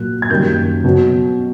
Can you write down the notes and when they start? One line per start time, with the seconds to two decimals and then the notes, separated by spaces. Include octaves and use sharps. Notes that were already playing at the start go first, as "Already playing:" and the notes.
Already playing: A#2 F#3 A#3 F#6
0.22 G#6
0.30 F#2 D#3 G3 A#3 G6
0.84 B2 F#3 B3